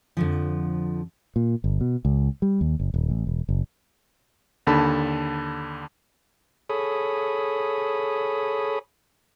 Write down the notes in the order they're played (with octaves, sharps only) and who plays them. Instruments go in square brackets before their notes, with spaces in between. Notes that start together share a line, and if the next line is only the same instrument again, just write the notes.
[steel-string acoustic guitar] F2 D3 F3
[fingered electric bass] A#2
G1
B2
C#2
G3
D#2
F#1
D#1
A1
E1
F#1
[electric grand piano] D#2 D3 A5 B5
[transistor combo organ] G#4 A4 C#5 B5 D#6